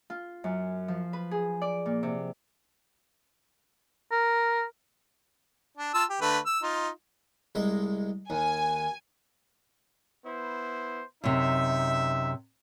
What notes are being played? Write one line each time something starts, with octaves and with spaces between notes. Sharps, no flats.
F4
F#2
F3
B4
G#4
D5
A#2
C3
A#4
D4
F4 A5 E6
G4
D3 A3 B4
E6
D#4 F4
C2 G#3 D#5
D#2 G#5
B3 E4 C5
F#2 C3 D#4 E5